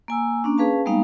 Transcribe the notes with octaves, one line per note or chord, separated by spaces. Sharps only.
A#3 G#5 E6
A#3 C#4 D4
C#4 G#4 B4 F5 A5
G3 G#3 A#3 B3 D#4 F5